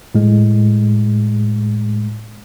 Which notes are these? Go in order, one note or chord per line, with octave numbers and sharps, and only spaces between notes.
A2 G#3